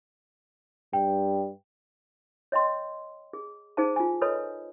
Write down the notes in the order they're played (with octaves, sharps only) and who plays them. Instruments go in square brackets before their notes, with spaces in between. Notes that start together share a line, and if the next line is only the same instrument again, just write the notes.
[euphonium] G2 [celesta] G5
[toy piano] C#5 D#5 G5 C6
G#4
D#4 G#4 C5 F5 A5
F4 G#5
A4 B4 C#5 D#5 B5